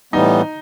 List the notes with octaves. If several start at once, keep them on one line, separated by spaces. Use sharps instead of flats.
A2 E3 G3 B3 D#4